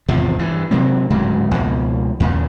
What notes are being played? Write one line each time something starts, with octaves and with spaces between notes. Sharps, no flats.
G#1 E2 C3 F3
G2 E3
C3 F#3 A#3 C4
D1 G#2 C#3 F#3
C#2 B2 F3 A#3
D#2 A#2 C#3